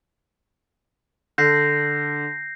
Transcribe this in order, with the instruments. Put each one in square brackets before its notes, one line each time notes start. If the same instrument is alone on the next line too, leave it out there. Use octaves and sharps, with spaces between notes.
[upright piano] D3 [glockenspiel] G6 A#6 C7